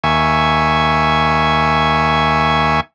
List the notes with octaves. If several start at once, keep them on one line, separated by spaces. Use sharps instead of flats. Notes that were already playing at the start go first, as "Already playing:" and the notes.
D#2 E5 G#5 C#6